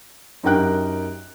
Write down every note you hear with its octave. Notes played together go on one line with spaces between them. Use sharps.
F#2 D#4 G4 A#4 G5 F#6